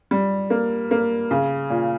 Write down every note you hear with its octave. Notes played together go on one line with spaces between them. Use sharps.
G3
A#3
A#3
C#3
A#2